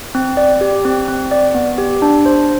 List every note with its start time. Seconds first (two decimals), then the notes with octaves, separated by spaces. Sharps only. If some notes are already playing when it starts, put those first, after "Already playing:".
0.15 C4
0.37 D5
0.61 G4
0.85 C4
1.08 C4
1.31 D5
1.54 B3
1.78 G4
2.02 D4
2.26 C5